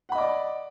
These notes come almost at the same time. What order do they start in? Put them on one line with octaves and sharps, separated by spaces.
F#5 B5 D#5 D6 D5